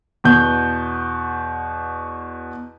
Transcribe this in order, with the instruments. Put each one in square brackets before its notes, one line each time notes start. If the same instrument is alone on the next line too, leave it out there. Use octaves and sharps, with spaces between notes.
[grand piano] E2 B2 G6